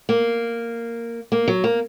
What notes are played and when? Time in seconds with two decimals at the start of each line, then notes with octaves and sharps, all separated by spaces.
0.09 A#3
1.32 A#3
1.48 F#3
1.64 A#3